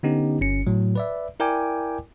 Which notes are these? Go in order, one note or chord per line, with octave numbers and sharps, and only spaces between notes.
D3 B3 C#4 D#4 G4
G1 C#4 C#7
A2 F#3
B4 D5 E5
E4 A#4 D5 G5 G#5 D6